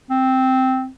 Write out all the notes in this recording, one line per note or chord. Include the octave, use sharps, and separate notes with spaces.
C4